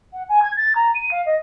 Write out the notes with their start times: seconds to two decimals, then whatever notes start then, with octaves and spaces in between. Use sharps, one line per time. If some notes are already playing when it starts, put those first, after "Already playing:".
0.13 F#5
0.29 G#5
0.42 G#6
0.57 A6
0.75 A#5
0.95 D#7
1.11 F5
1.26 D#5